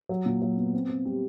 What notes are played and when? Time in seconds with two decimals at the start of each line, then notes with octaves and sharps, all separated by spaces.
0.09 F#3
0.26 A#2
0.42 F#3
0.57 B3
0.74 C4
0.89 C4
1.05 G3